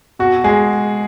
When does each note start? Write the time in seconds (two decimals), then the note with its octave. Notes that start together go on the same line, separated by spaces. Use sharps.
0.19 B2 F#4
0.44 G#3 G#4